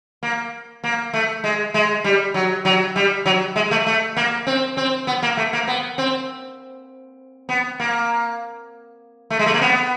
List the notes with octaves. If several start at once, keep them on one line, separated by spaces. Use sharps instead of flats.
A#3
A#3
A3
G#3
G#3
G3
F#3
F#3
G3
F#3
G#3
A3
A3
A#3
C4
C4
B3
A#3
A3
A#3
B3
C4
B3
A#3
A3
G#3
A3
A#3
B3